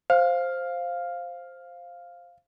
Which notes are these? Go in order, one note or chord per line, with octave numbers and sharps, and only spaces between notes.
C5 F5